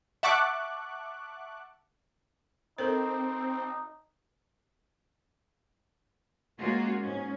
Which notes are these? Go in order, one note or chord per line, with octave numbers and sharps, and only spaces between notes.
E5 F#5 A5 C#6 D6 F#6
C4 D#4 A4 A#4 C5
G#3 A#3 C#4 F4 F#4
G#2 C#4